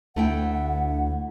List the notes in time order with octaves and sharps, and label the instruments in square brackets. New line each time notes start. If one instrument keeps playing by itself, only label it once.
[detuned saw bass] D2 [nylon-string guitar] A3 E4 G5 [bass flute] F#5